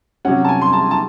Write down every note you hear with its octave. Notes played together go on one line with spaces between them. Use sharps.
C3 F#3 C#4 F#5
A5
G#5
C6
A5
A5